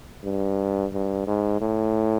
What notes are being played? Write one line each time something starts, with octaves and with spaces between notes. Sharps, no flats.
G2
G2
G#2
A2